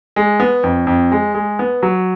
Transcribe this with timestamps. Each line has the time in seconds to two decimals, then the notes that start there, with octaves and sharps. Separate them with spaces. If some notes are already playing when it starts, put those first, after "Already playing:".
0.16 G#3
0.40 B3
0.63 F2
0.87 F2
1.12 G#3
1.34 G#3
1.59 B3
1.83 F#3